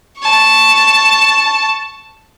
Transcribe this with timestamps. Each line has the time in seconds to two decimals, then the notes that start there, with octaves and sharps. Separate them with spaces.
0.19 A5 C#6